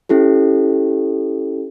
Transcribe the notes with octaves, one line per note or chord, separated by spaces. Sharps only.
C#4 E4 G4 A4